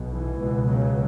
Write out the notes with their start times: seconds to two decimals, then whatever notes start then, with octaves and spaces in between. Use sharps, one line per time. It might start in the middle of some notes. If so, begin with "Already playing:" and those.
Already playing: B1 B2
0.10 E3
0.39 C#2 B2
0.67 C#3 F#3